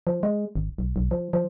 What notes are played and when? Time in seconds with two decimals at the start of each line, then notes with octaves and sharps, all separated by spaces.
0.07 F3
0.23 G#3
0.56 G#1
0.78 B1
0.96 B1
1.11 F3
1.33 F3